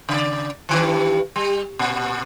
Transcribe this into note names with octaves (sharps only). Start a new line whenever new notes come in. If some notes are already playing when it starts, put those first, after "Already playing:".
C#3 D5
G2 D#3 E3
G3
A#2